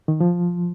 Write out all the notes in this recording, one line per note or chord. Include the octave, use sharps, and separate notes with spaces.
D#3
F3